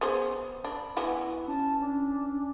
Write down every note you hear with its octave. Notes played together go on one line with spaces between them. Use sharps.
B3 G#4 C5
D4 B5
E3 B3 E4 F#4
C#4 A5
D4